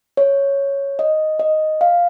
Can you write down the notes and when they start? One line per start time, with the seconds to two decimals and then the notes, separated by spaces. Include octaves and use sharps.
0.17 C#5
0.99 D#5
1.40 D#5
1.81 F5